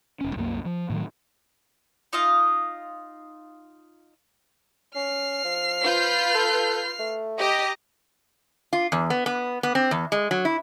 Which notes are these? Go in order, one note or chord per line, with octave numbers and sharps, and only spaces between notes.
E1 C#4
C2 F#2 F3 A#3
F3
A2 D#3 F#3
D#4 F4 D#5 F5
C#4 F6 C7
F3
F4 B4 G6
A4
A3
G4 D#5 A#5
F4
E2
B3
B3
B3
C4
E2
G#3
F#3
E4